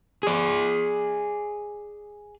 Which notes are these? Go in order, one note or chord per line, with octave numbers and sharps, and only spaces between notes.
G#4 D5